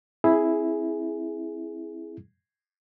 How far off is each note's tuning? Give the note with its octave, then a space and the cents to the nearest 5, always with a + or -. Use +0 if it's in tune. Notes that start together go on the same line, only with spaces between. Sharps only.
C4 +15 E4 +0 G#4 +5